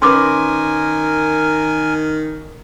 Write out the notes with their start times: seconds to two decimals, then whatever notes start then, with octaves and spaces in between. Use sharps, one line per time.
0.02 D#3 C#4 A#4 B4 G#5 C6 D6